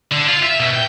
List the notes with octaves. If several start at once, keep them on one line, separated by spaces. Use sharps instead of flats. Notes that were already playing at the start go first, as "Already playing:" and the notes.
D3
F4
E5
B2
G5